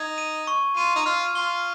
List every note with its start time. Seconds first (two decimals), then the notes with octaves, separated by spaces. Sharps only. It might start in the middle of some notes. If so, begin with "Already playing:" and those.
Already playing: D#4 G#6
0.18 D#7
0.47 C#6
0.77 F4 D#7
0.96 D#4
1.06 F4 F6
1.35 F4 G7